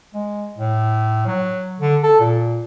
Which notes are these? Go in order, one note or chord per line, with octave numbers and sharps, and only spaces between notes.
G#3
A2
F#3
D3
A4
A#2